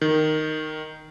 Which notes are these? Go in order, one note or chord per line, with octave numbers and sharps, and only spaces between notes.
D#3